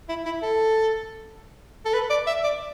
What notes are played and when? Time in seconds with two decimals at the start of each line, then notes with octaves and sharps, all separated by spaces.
0.09 E4
0.25 E4
0.42 A4
1.85 A4
1.94 B4
2.10 D5
2.27 E5
2.44 D5